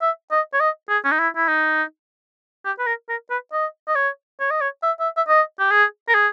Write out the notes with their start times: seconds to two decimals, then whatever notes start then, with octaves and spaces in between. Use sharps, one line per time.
0.02 E5
0.31 D#5
0.53 C#5
0.60 D#5
0.89 G#4
1.04 C#4
1.11 D#4
1.19 E4
1.36 E4
1.48 D#4
2.65 G4
2.79 B4
2.86 A#4
3.09 A#4
3.30 B4
3.52 D#5
3.88 D#5
3.95 C#5
4.40 C#5
4.51 D#5
4.61 C#5
4.83 E5
5.00 E5
5.17 E5
5.28 D#5
5.59 G4
5.71 G#4
6.08 A#4
6.14 G#4